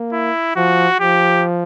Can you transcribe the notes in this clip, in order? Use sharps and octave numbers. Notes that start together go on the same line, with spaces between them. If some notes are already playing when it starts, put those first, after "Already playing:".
Already playing: A#3
E4
F3 F#4
F3 G4